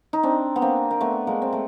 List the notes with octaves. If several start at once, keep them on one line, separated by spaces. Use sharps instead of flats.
D#4
C4 D4
B3
A#3 C4
A#3
A3 B3
G#3 A#3
C4
A3